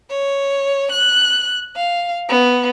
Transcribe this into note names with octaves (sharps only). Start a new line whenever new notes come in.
C#5
F#6
F5
B3